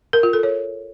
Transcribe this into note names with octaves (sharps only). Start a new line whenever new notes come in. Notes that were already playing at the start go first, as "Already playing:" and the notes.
A#4
F4
A4
C#5